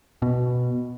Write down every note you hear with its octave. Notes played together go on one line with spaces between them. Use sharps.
B2